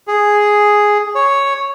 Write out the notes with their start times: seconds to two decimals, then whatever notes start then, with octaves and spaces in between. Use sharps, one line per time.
0.07 G#4
1.15 C#5